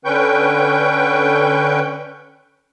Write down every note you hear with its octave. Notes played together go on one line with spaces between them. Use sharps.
D3 C#4 B4 G5 C#6 G6